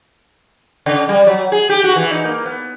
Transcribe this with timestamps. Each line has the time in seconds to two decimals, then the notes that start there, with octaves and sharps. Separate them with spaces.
0.86 C#3
1.09 G3
1.27 F#3
1.52 G#4
1.69 G4
1.84 F#4
1.96 E3
2.11 D#4
2.25 A#3
2.46 B3